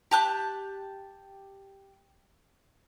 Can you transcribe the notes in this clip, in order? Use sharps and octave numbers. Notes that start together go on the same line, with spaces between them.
G4 A5 F#6